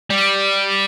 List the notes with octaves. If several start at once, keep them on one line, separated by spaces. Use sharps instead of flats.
G3